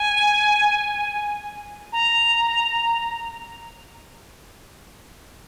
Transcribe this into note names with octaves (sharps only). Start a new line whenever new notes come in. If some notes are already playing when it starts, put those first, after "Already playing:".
Already playing: G#5
A#5